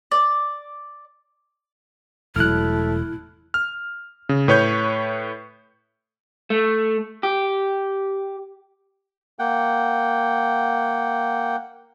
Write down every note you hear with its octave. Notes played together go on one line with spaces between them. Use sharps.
D5
E1 F#3 A3 E4 F6 F#6
F6
C#3
A2 B4 C#5 C#6 G6
A3
G4
A#3 F#5 G5